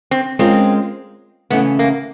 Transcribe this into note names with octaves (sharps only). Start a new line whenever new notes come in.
C4
G#3 C4 C#4 F4 A#4
C#3 E3 A3 B3 C#4 E4
A#3